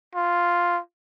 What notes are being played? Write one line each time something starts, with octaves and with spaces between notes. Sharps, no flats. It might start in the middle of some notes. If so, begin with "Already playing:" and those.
F4